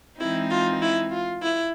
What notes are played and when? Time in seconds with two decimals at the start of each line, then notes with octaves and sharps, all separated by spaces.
0.19 E3 G#3 C4 D#4 E4
0.50 F4
0.81 E4
1.11 F4
1.42 E4